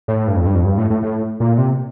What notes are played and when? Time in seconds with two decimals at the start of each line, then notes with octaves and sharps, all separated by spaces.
0.08 A2
0.27 G2
0.36 F2
0.47 G2
0.55 F2
0.65 G2
0.78 A2
0.90 A2
1.03 A2
1.40 A#2
1.58 C3